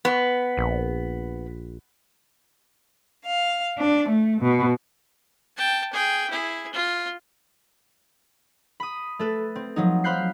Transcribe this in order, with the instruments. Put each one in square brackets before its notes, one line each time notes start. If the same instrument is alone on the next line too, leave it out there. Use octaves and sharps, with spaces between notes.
[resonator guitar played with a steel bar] B3
[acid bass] A#1
[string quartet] F5
D4
A3
B2
[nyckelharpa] G5 A5
G#4 G5
E4 G#4
F4
[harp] B5 D#6
A3 A4 B4
C4
F3 F#3 D#4
C5 F5 B5 F#6 G6 C7